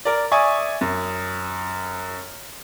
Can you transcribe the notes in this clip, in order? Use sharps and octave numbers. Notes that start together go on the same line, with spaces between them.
A#4 D5
D5 E5 G#5 C#6 D#6
F#2